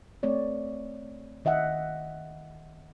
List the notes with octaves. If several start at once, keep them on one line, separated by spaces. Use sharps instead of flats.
A3 C4 C#5 D5
D#3 D#5 E5 F#5